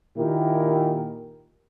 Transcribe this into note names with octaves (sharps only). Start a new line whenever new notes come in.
A#2 D#3 E4 G4 A#4